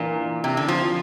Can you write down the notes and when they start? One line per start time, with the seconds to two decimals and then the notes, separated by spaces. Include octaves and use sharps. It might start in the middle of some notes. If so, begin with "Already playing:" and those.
Already playing: A#2 E3 A#3 D4
0.44 C3
0.57 D3
0.68 F3